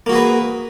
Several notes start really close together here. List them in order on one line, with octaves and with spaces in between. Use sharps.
A#3 F#4 G#4 B4